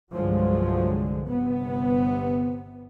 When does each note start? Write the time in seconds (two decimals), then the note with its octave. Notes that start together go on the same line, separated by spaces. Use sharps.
0.12 C2 G2 D3 F3 F#3 G#3
1.24 G1 C3 B3